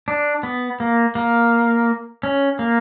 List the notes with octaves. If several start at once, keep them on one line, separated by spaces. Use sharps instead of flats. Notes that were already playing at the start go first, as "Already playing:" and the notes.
D4
B3
A#3
A#3
C#4
A#3